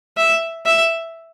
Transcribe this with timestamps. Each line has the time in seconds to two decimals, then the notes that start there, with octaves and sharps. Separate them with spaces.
0.17 E5
0.66 E5